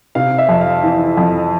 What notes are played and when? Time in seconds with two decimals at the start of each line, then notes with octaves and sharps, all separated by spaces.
0.15 C3 F5
0.38 E5
0.49 F2
0.61 F5
0.83 E3
1.17 F2